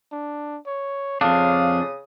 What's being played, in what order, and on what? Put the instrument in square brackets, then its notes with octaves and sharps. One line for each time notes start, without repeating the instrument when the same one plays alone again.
[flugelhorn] D4
C#5
[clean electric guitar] F2 D4 [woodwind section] C#3 D#6 [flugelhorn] F5